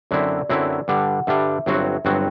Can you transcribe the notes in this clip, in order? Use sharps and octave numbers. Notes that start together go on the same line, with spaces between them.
F#2 D3 F#3 C4 E4 D5
F#2 D3 F#3 C4 E4
G2 D3 G3 D4 F#5
G2 D3 G3 D4 E5
G1 G2 F#3 C4 F#4
G1 G2 F#3 C4 F#4 G5